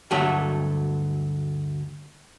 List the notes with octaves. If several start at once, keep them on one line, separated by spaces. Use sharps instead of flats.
D2 G2 D3 F#3 A3 F#5